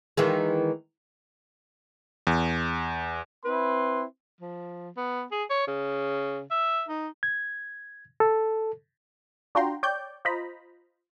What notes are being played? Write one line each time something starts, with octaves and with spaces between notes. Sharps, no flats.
D#3 E3 G#3
E2
C4 E4 B4 C6
F3
B3
G#4
C#5
C#3
E5
D#4
G#6
A4
D4 F4 F#4 G5 A#5 C6
C#5 D5 G5 G6
F4 C5 D#5 A#5 B5